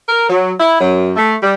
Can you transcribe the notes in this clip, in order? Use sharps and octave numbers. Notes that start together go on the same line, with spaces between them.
A#4
F#3
E4
F#2
A3
G3